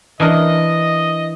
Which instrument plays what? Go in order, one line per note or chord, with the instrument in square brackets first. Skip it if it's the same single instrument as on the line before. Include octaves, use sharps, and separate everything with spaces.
[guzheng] E3 D4 A#4 [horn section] D#5